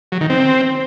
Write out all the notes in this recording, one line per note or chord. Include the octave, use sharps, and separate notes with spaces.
F#3
D#3
C4